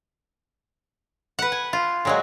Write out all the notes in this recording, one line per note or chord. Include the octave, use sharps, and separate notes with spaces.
B4 F#5
G#5
F4
A#2 F#3 G#3